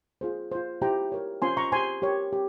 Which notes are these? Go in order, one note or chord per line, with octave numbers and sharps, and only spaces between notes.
F4 G#4 C5
F4 C5
E4 G4 C5 G5 A#5
G4 A#4 C#5
C#4 F4 C5 G#5 C6
A#5 C#6
G4 C5 G#5 C6
G4 A#4 C#5
G4